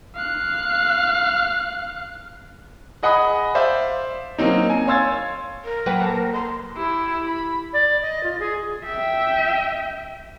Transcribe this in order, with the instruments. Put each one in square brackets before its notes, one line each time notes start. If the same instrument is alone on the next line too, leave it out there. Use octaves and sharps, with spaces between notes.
[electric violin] F5 F#6
[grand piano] G#4 D#5 F#5 G#5 B5 D#6
C5 D5 E5 F5
F#3 A#3 C4 C#4 D#4
G#5
C#5 F5 C6 E6 G#6 A6
[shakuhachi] A#4
[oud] F#3 A#3 B4 [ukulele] F#5 G5
[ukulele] A4 C5 A5
[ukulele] D#5 A#5 [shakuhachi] C6
[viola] E4 G4
B5
[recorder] D5
D#5
F4
G#4
[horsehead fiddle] E5 G5